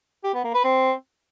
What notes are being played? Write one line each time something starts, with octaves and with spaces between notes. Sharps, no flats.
G4
B3
A#3
B4
C4